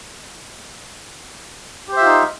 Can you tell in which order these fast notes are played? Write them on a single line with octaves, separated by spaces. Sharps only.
G4 C5 E5 F4 D#4